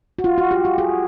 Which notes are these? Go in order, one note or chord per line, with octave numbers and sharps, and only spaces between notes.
F#4
F4
F#4
G4
G4
G#4